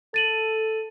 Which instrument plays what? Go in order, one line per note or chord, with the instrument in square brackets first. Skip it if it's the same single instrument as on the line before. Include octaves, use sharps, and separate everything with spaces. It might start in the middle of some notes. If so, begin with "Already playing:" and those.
[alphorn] A4 [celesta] A6 D#7 F#7